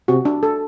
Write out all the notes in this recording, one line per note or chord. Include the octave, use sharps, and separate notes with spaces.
C3 F#4
D4
A4